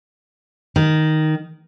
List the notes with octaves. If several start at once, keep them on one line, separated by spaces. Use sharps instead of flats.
D#3